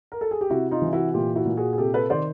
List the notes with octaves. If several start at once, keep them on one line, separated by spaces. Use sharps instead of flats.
A#4
A4
G#4
G4
C3 E4 F#4
D#4 F4
E3
E4 F#4
A#2 F4 G4
E4 F#4
A#2
F#4 G#4
G#4
C3 G4 A4
A4 B4
D#3 C5 D5